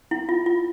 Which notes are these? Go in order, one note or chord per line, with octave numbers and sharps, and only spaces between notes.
E4
F4
F4